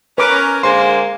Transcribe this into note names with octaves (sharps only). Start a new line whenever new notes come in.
C#4 A#4 B4 D6
D3 G#3 A#3 C5 G#5 C6